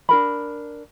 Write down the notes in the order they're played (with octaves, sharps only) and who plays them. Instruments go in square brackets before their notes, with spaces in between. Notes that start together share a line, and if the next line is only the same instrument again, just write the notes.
[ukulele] D4 A#4 B5